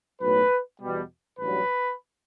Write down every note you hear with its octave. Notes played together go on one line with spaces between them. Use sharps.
B1 A2 F#3 B4
E2 B2 G3
A1 G2 F#3 B4